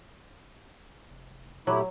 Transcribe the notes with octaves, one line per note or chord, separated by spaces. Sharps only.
F1
A#2 F#3 A3 E4 G4